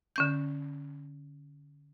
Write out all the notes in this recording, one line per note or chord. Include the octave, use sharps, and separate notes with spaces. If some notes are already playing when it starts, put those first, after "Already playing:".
D3 C#4 G6